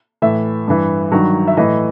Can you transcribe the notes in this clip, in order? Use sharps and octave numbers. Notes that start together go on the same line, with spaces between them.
A2 E3 E5
G2 E3
G2 D#3 F#3
E5
A2 E3 D#5